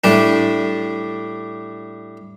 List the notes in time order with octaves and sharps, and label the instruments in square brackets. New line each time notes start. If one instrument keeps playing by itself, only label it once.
[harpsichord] A2 G3 D4